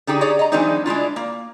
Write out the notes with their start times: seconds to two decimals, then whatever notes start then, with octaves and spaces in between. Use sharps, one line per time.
0.07 D3 D#4 G4 G#4
0.21 G#4 C#5 D5 A#5
0.39 D#5 A#5
0.52 E3 F#3 G#3 C4 D4 D#4
0.86 G#3 D4 E4 F4
1.16 A#3